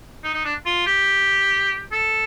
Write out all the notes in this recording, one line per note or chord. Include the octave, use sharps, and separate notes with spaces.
D#4
D#4
D4
F4
G4
A4